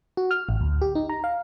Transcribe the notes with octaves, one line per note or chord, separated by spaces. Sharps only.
F#4
F6
A1
D2
G4
D#4
A#5
F5